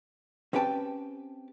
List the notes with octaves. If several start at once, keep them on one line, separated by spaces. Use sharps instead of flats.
C4 C#4 G4 B4 G5 A5